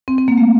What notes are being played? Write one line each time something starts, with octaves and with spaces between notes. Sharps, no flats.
C4
C4
A#3
A3